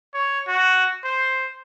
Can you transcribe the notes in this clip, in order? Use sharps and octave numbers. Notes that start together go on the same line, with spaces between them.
C#5
F#4
C5